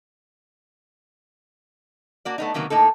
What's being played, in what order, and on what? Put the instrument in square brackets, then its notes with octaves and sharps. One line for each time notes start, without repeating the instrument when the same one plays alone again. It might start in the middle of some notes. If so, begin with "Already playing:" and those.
[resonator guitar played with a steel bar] A#3 F#4 D5
A3 B3 D#4
C3 D#3 F#3 A#3 B3
A2 A#3 D#4 A4